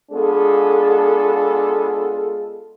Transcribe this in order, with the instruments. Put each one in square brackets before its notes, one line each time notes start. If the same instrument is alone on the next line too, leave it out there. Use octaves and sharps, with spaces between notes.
[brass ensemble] G#3 B3 D4 F4 G#4 A4